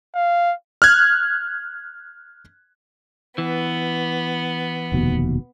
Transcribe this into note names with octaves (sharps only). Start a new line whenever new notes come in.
F5
F6 F#6 G#6
E3 B3
F1 D#2 B2